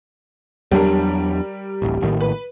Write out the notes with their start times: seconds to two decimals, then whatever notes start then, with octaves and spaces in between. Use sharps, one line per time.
0.71 E2 F#3 G3 D4 A#4
1.82 D1 A1
2.02 A#1 A2 D#3
2.21 B4